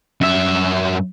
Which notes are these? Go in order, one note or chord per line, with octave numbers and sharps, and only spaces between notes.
F#2 E5